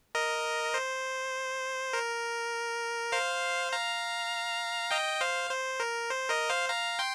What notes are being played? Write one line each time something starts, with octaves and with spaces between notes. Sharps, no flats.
A#4 D#5
C5
A#4
C5 F5
F5 A#5
D#5 G5
C5 F5
C5
A#4
C5
A#4 D#5
C5 F5
F5 A#5
G5 C6